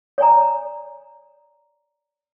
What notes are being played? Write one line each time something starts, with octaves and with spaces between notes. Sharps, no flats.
C#5 D5 G#5 A#5